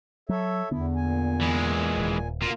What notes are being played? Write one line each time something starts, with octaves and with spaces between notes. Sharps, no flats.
F#3 A4 C#5 E5
E2 D3 B3 E4
A#2 G#5
E3 G#3
D#1
F#2 B2 D3 A#3 F4